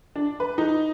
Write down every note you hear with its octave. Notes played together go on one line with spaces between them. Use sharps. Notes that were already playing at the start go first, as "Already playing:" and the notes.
D4
B4
D#4